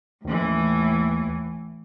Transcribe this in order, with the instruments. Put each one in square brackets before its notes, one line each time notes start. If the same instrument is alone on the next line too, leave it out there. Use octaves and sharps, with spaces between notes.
[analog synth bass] D#2 [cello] A2 E3